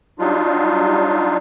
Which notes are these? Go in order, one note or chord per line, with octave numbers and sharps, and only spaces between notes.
F#3 G3 D4 D#4 F4